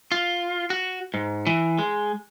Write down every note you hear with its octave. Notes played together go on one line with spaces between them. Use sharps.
F4
F#4
G#2
E3
G#3